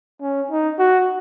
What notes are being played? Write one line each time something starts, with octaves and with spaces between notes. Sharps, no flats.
C#4
D#4
F#4